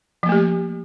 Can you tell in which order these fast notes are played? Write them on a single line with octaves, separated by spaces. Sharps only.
F3 A#3 A3 G4